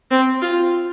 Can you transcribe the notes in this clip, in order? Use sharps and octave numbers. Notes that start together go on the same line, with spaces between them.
C4
F4